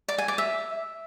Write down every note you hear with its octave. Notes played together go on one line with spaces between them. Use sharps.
D5
G#5
D5
E5